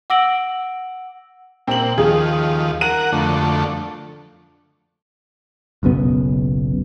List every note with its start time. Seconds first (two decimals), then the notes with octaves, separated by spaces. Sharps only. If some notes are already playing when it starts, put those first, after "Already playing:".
0.10 F#5 D6 E6 A#6 D7 F#7
1.68 A#2 C4 F#7
1.98 D#2 F3 G#4
2.81 A#4 F#5 D#7
3.12 F2 D3 A3
5.83 F#1 B1 F#2 B3